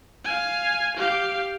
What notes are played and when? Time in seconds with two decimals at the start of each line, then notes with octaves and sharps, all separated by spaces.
0.25 F5 G#5
0.97 G4 F5